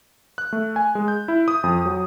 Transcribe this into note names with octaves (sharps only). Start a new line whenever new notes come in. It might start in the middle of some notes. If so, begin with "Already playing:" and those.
F#6
A3
G#5
G#3
G6
E4
D#6
F2
F#3